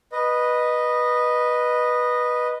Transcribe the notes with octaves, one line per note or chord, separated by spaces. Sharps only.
B4 D#5